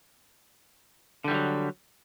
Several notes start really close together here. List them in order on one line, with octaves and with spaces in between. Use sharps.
D3 G3 E3 F#3